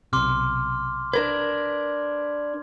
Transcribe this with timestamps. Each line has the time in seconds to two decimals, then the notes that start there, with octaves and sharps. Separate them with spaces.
0.13 B1 C3 C6 D6 F6
1.13 D4 A#4 B4 G#6